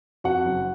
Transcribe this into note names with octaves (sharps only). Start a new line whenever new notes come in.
F2 F#4 F#5
F#1